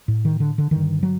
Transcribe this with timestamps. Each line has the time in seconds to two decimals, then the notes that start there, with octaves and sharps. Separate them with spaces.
0.08 A2
0.25 D#3
0.40 D3
0.58 D3
0.71 G2 D3 D#3
1.03 F#3